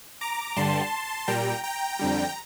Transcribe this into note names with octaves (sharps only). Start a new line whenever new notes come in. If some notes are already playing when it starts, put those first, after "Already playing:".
A#5 D6
G2 D3 G3 A5 C6
A#2 G3 G5 A#5
G5 A#5
F2 D3 G3